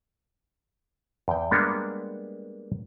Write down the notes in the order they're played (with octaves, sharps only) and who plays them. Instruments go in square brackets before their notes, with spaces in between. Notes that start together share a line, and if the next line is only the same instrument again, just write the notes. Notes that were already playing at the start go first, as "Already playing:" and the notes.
[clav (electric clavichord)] E2 G5
G3 G#3 A#3 B3 D4 C#5